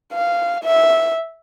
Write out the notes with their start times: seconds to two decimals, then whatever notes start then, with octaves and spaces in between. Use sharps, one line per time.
0.13 F5
0.64 E5